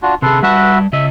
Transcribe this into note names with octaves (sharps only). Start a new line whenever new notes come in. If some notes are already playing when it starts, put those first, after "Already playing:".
D4 F4 F#4
C3 G#4 A4 B4 C6
G3 F#4 B4 E5 A5
C#3 D#5 E5